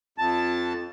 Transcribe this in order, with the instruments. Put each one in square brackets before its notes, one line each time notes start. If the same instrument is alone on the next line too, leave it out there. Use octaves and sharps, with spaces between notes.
[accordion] F2 A5